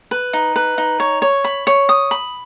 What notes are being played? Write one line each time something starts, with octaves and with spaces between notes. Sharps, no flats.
B4
D#4
B4
D#4
C#5
C#5
B5
C#5
D#6
B5